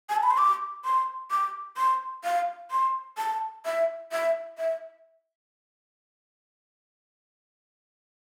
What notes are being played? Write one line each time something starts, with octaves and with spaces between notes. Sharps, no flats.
G#5
A5
B5
C6
D6
C6
D6
C6
F5
C6
A5
E5
E5
E5